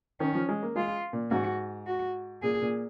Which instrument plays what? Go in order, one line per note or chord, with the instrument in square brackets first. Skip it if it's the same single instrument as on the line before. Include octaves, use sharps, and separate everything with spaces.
[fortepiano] D#3 [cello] C#4
[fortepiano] F3
G#3
A#3
[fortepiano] G#3 [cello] F4
[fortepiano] A#2
[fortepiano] G#2 [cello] F#4
[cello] F#4
[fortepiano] A#2 [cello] G#4
[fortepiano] A#2